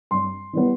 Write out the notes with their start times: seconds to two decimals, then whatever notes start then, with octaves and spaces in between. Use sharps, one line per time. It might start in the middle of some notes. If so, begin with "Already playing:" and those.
0.11 G2 C6
0.53 E3 G3 B3